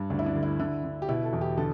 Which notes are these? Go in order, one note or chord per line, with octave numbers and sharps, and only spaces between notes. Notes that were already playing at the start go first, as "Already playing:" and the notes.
Already playing: G2
D2 D4
E4
D4
D3
E4
D3 E4
D3
G4
B2 E4
A4
E2
G4
D3 A4